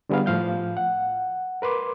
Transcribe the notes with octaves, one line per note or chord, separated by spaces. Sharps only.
D3 G3 B3 G#4 F5
A2 F3 F5 G6
F#5
A#4 B4 C6 D6